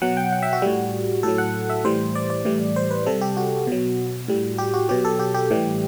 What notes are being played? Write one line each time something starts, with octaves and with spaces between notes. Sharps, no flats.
B2 F#3 F#5
G5
F#5
E5
F#4
A2 G3
A2 F#3 A4
F#5
E5
A2 E3 G3 C5
D5
D5
A2 E3 G3
C5
B4
C3 G3 A4
G4
F#4
B2 F#3
A2 G3
G4
F#4
B2 F#3 G4
A4
G4
G4
A2 E3 G3